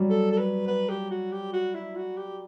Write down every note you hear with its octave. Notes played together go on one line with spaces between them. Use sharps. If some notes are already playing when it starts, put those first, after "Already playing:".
Already playing: F#3 G3
A4
A4
B4
B4
G4
F#4
G4
F#4
E4
F#4
G4